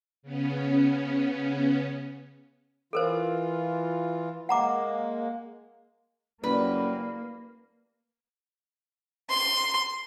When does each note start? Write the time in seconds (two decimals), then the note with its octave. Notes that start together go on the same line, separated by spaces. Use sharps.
0.22 C#3 B3 C#4
2.93 E3 F4 A4 A#4 C5
4.49 G#3 A#3 F#5 A#5 D6
6.44 F#1 F#3 G3 A#3 B4 D5
9.30 C6